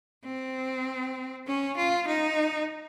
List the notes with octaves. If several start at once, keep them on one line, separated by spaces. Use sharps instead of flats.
C4
C#4
F4
D#4